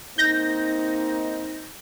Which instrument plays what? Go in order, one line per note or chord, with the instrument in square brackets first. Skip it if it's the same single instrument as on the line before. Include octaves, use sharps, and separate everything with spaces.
[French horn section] A#3 C4 D#4 [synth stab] G6 A#6